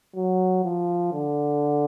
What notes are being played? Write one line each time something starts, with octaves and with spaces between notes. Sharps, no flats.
F#3
F3
D3